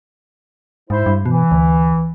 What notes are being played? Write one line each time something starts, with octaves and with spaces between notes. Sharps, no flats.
G#2 E4 C5
G2
B2 E3
D2